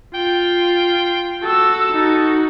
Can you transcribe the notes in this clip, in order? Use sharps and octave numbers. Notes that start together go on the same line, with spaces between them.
F4 G5
F#4 A4 E6
D#4 F#4